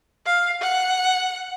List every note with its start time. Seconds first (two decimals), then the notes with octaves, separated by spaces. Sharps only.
0.26 F5
0.61 F#5